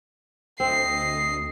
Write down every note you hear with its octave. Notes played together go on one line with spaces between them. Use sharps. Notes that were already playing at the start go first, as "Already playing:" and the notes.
D2 C4 D#5 C7